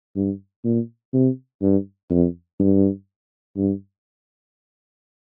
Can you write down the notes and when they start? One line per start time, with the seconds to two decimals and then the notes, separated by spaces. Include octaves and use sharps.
0.16 G2
0.65 A#2
1.14 C3
1.62 G2
2.10 F2
2.60 G2
3.57 G2